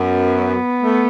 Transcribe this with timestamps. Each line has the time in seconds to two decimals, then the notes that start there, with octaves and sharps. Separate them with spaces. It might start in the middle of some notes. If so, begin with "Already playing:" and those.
Already playing: F#2 B3
0.83 A3